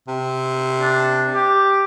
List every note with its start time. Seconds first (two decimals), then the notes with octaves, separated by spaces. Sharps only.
0.08 C3
0.81 D4
1.34 G4